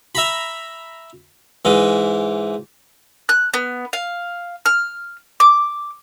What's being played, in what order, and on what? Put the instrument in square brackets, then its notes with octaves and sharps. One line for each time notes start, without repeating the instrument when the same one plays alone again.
[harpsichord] E5 A#5 B5
G#2 E3
[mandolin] F#6
B3
F5
F6
D6